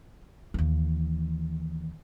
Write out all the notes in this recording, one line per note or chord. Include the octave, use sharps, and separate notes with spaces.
D#2 E3